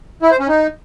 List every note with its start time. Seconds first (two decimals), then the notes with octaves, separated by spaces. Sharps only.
0.22 E4
0.31 C5
0.39 C#4
0.48 D#4